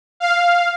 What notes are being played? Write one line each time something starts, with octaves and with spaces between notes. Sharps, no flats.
F5